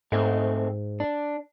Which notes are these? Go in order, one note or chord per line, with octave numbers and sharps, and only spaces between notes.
G#2 G#3 A3 C4
D4